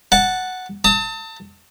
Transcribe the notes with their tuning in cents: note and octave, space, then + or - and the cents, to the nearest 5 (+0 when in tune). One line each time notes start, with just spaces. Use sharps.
F#5 +0 A5 +0
A5 +30 D#6 +45